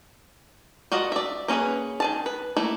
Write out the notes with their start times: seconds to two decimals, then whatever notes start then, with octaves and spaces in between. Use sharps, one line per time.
0.92 F4 F#4 A#4 D5 D#5
1.12 D5 E5
1.48 A#3 C#4 F#4 G#4 B4
2.00 D#3 G#4 A5
2.26 B4
2.57 A3 A#3 E4